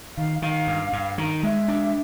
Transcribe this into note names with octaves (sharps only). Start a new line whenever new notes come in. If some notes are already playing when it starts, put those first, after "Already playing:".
D#3 F5
D#3 F5
G2
G2
D#3
G#3 E5
D4